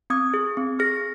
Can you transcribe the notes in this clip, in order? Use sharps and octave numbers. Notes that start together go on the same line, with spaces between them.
C4 D#6 G#6
G#4
C4
G#4 F6 A#6